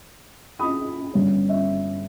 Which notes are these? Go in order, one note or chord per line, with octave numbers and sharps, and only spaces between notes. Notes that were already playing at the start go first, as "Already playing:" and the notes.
B5 D#6
G1 G2 G3 C#4
E5